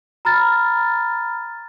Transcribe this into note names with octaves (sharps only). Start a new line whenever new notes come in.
A#5 B5 F6 A6